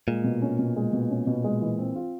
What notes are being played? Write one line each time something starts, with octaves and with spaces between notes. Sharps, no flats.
A#2 G#3
B2
C#4
B2
G#3
B2
C#4
B2
G#3
E3
C4
F4